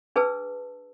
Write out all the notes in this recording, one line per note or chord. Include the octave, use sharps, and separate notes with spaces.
D4 G#4 B4 A5 E6